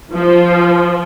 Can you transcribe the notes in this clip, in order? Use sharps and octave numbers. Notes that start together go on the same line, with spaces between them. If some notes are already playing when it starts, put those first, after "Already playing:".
F3